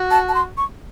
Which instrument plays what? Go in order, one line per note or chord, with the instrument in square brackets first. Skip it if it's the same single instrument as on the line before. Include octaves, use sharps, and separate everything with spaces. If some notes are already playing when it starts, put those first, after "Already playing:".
Already playing: [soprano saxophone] F#4
[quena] A5
A5
C6
C#6